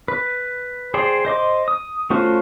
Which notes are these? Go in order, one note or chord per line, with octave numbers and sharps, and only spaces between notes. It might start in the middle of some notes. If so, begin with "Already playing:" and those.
B4
G#4 C5 D5 G5
C5 D#5 C6 D6
D#6
A3 C#4 F4 F#4 C5